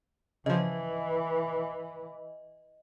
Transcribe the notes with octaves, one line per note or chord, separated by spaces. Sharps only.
C#3 E3 F3 D#5